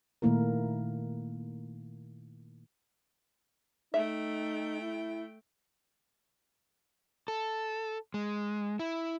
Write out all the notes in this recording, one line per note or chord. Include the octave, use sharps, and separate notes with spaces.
A#2 D#3 A3 A#3 E4 A#4
A3 D#4 E5 G5
E4
A4
G#3
E4